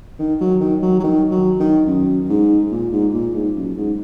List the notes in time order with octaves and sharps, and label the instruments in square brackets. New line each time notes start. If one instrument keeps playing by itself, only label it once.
[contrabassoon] D#3
F#3
D#3
F#3
F#3
D#3
F#3
D#3
F#2
G#2
A#2
G#2
A#2
G#2
F#2
G#2